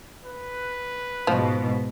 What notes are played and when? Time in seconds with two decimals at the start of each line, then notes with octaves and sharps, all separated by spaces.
0.25 B4
1.27 G#2 B2 F3